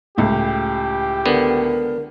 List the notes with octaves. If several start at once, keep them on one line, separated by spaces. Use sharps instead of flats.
C#2 A2 G4
D3 B3 A#4